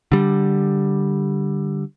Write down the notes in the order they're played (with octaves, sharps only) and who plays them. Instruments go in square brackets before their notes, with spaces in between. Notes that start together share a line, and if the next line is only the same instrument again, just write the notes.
[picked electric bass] D3 G3